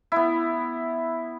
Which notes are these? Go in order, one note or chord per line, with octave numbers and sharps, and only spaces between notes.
B3 E4